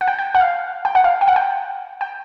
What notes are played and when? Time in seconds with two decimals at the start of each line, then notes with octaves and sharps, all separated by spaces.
0.01 F#5
0.07 G5
0.19 G5
0.35 F#5
0.40 F5
0.85 G5
0.95 F#5
1.04 F5
1.21 G5
1.28 F#5
1.36 G5
2.01 G5